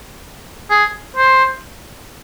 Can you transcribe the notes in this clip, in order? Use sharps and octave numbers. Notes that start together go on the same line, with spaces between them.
G#4
C5